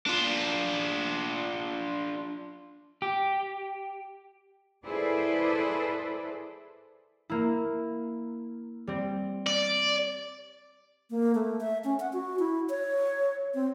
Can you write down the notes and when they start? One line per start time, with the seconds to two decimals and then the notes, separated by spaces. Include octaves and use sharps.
0.06 D4 F4
3.02 G4
4.86 E4 G#4 A4 B4 C5 D5
7.30 A#3 E4
8.87 G3 C4
9.47 D5
11.10 A#3
11.35 A3
11.60 E5
11.84 C#4
12.00 F#5
12.13 F#4
12.39 E4
12.70 C#5
13.54 C4